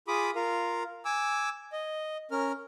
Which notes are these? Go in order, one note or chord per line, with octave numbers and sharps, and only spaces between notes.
F4 G#4 B5 D6 D#6
F4 A#4 F5
G#5 D6 E6
D#5
C#4 A#4 F6